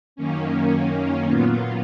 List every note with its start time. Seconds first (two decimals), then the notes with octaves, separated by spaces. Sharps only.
0.16 F#2 D#3 A#3 C#4
1.24 A#2 F#3 B3 F4